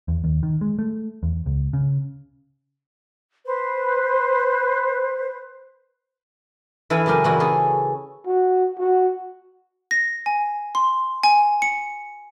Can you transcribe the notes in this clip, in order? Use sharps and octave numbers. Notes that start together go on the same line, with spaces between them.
E2
D#2
D#3
G#3
A3
E2
C#2
C#3
B4 C5
E3 E4 A4 F5 G#5
F#2 C#3 G4 A#4 G#5
A#2 E3 E4 F#4
C#4 G#4 A4
F#4
F#4
A#6
G#5
C6
G#5
C#7